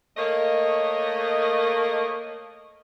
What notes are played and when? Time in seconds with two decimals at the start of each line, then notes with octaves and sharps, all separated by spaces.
0.17 A3 A#3 C#5 D#5